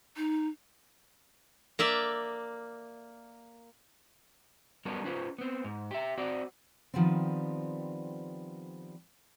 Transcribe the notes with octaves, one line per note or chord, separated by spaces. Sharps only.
D#4
A#3 D5 E5
F#3 G3 B3 C#4 A4 A#4
C#4 F4 B4 C5
B3 C4
G#2
G4 E5
C4 F#4 D5
D#3 F3 G3 B3 C4